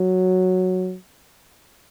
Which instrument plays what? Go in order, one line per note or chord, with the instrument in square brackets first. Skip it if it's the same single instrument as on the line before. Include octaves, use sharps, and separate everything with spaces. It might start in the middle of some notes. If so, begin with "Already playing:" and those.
Already playing: [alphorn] F#3